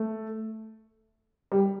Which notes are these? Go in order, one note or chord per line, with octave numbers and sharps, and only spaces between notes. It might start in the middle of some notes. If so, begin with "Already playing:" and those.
Already playing: A3
G3